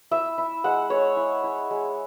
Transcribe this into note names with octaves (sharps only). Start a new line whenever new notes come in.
E4 E5
E4
G#3 F#5
G#3 C#5
E4
E4
G#3